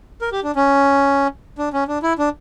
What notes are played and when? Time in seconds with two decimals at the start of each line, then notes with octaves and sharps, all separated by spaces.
0.22 A#4
0.32 G4
0.43 D4
0.56 C#4
1.58 D4
1.73 C#4
1.88 D4
2.03 E4
2.19 D4